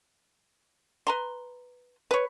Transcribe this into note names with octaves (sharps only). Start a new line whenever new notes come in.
B4 A#5 C6
B4 C#5